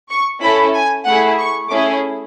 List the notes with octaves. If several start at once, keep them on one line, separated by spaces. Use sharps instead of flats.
C#6
C#4 E4 A4 B5
G#5
A3 E4 G#4 F#5
C#6
A3 C#4 E4 G#4 D6